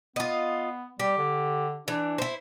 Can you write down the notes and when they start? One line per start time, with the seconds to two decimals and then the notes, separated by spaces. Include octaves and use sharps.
0.16 B3 F4 D#5
1.00 G3 G4
1.18 D3
1.88 E3 D4
2.18 E4 C5